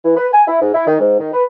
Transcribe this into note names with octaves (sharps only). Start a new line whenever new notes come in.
E3
B4
G#5
E4
G#2
E4
D#3
G#2
D#3
B4